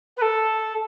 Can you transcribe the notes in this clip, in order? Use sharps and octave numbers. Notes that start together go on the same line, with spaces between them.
B4
A4